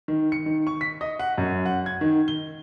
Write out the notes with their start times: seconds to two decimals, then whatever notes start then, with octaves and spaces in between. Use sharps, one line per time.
0.08 D#3
0.32 C#7
0.46 D#3
0.67 C#6
0.81 B6
1.01 D#5
1.19 F#5
1.38 F#2
1.66 F#5
1.86 G#6
2.01 D#3
2.28 G7